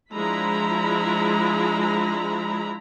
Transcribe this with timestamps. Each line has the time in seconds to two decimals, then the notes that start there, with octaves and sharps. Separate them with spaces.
0.14 F3 G#3 D4 E4 A#5 B5